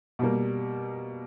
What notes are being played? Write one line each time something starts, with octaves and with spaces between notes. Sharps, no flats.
B2 G3 A#3